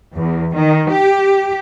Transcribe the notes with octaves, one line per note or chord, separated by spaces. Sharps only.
E2
D#3
G4